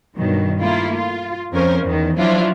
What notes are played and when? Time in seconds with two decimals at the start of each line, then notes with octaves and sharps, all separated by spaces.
0.16 G2 B2 D#3 F#3
0.59 A3 A#3 E4 F4
0.94 F4
1.52 F2 C#4 A#4 C5
1.84 E2 D#3
2.17 F3 F#3 D4 E4 F4